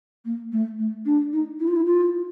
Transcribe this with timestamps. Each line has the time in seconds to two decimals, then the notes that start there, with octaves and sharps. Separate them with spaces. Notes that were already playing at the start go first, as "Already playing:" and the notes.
0.25 A#3
0.52 A3
0.79 A3
1.05 D4
1.33 D#4
1.60 E4
1.67 F4
1.76 E4
1.86 F4